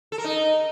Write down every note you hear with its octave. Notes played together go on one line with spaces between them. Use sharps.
A4
A#4
D#4